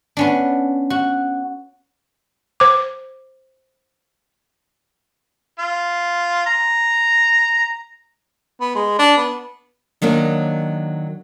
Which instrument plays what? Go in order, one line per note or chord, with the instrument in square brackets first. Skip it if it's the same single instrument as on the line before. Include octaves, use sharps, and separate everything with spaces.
[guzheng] B3 C#4 D4
F#4
[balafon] C5 D6
[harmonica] F4
A#5
[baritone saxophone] B3
G#3
D4
B3
[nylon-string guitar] D#3 F#3 A#3 D4